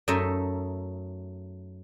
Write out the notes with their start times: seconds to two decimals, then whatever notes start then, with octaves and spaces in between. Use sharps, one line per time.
0.08 F#2 A3 D#4 A4 D#5 E5